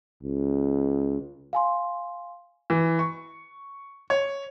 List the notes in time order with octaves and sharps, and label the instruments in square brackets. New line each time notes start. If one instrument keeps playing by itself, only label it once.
[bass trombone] C#2
[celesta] F5 G#5 C6
[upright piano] E3
C#6
C#5